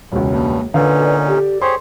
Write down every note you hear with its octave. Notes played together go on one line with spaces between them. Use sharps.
E1 C#2
G2 A#3
A#2 D3 C#4 D#4 B4 F5
A4 D5
G4
G4 G#4 C5 C#5 C6